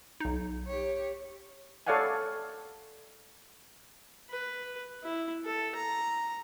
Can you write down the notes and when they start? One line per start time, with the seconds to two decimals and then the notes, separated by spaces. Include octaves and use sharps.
0.20 B1 D#4
0.68 G4 C#5
1.87 A4 C#5 D5 F5 F#5 G#5
4.29 B4
5.03 E4
5.45 A4
5.75 A#5